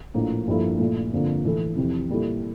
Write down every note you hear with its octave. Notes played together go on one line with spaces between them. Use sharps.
A#1 A2 F3 A#3
G2 F3 A#3 E4 A4
A#2 A3 E4
G1 F2 D3 F3 A#3
A2 E3 A3 E4 A4
F1 F2 C3 E3
A#2 G3 A#3 E4 A4